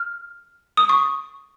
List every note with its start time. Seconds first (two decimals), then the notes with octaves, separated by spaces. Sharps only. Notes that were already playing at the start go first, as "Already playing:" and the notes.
Already playing: F6
0.77 D#6
0.89 C#6